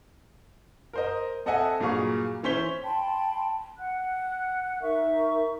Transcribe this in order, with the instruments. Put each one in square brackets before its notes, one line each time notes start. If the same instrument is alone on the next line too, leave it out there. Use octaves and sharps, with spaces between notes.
[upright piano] A#4 C5 D#5
C4 A4 D#5 E5 F#5 G#5
G2 A#2 F#3 G#4 F5 C#6
E3 C#4 C5 B6 G7
[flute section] G5 A5 B5 C6
F#5 F#6
D#4 A#4 E5 C#6